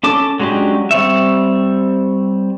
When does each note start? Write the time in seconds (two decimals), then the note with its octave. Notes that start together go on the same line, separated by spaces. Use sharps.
0.03 C#4 A4 D6
0.40 F#3 G#3 C#4 D4 G4
0.91 G3 C4 C#5 E5